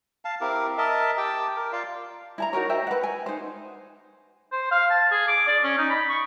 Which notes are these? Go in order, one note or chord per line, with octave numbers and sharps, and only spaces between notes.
F5 A5
C4 E4 G4 A#4
A#4 D#5 E5 A5
G4 G5 A5
A#4
F4 D5 F5
E4 A5 A#5
D#4 F#4 A#4 C#5
C5 D#5 E5 G5
B4 F#5
G#5
D#4 C5
C5
F5
A5
G#4
D6
D5
C#4
D#4
B5
C#6